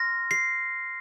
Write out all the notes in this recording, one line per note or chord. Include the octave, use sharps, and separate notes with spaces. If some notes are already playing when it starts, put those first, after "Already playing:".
Already playing: C6 F6 A#6
C7